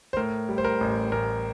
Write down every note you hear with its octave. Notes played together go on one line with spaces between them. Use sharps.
C5
A2 A#4
G3
C5
A#4
A1
A1 A#4